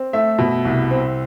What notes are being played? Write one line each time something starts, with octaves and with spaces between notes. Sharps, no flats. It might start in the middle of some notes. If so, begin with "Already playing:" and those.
Already playing: C4
A3 E5
B2
C2
C4